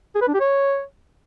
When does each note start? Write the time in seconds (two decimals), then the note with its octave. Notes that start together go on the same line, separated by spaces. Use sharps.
0.15 G#4
0.21 B4
0.28 D4
0.34 G4
0.40 C#5